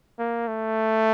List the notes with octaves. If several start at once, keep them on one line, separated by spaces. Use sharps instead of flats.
A#3
A3